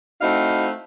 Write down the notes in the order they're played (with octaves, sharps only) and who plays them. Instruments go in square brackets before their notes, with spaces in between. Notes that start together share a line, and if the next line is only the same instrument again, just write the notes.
[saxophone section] A3 C4 D#4 E4 F#4 F5